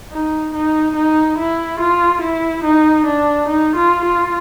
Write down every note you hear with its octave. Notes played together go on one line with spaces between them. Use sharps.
D#4
D#4
D#4
E4
F4
E4
D#4
D4
D#4
F4
F4